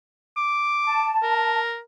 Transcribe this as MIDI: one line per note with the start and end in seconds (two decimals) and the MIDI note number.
0.37 1.10 86
0.85 1.58 81
1.23 1.79 70